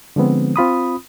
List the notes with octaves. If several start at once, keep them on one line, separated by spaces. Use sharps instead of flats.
D3 F3 G#3 B3 C4
C4 F4 B5 D#6